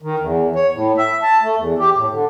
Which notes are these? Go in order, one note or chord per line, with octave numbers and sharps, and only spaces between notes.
D#3
E2
C#5
A2
E5
A5
A3
E2
G4
A2
D3